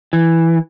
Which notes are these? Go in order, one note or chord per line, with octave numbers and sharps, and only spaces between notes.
E3